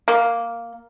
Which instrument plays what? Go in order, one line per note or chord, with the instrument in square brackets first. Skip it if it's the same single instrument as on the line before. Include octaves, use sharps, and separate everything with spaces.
[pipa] A#3